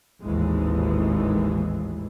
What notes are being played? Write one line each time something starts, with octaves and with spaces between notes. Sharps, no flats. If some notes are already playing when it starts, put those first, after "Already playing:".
G#1 D#2 A2 E3 G#3